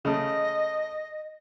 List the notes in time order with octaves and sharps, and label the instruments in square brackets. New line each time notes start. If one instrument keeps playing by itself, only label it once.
[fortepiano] C#3 A3 [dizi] D#5